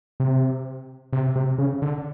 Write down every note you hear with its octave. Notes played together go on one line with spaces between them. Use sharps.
C3
C3
C3
C#3
D3